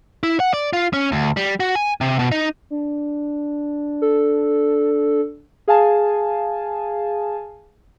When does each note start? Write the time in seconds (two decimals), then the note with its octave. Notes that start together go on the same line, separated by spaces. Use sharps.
0.23 E4
0.40 F#5
0.54 D5
0.73 F4
0.94 C#4
1.12 D2
1.37 G3
1.60 F#4
1.75 G#5
2.01 C3
2.19 B2
2.32 D#4
2.70 D4
4.02 A4
5.68 G#4 F5 G#5 A5